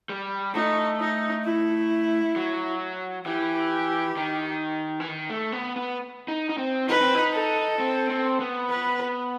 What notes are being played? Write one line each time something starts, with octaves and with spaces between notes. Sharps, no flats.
G3
A3 D#4
D#4
E4
F#3
E3 G4
D#3
E3
D#3
A3
B3
B3
D#4
D#4
C4
D#4 B4
C4
D#4
A4
C4
C4
B3
B4